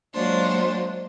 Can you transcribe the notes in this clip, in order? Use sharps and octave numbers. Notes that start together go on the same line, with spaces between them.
F#3 G#3 A#3 D4 F4 C5